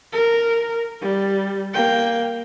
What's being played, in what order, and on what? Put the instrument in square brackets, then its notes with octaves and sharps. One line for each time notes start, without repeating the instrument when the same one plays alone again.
[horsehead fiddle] A#4
G3
A#3 G5